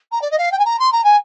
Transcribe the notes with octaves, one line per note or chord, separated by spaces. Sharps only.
A#5
D5
D#5
F5
G5
G#5
A#5
C6
A#5
G#5